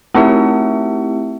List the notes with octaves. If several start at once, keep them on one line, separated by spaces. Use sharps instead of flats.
A3 C4 E4 G4 E5